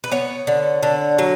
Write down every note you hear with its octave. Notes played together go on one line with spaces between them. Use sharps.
B4
B3 C#5
D3
D3
F#3